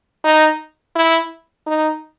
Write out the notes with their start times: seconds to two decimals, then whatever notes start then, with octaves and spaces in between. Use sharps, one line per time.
0.24 D#4
0.96 E4
1.67 D#4